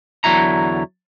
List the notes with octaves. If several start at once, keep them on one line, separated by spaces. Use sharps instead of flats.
E2 D3 F#3 G#3 E4 A#5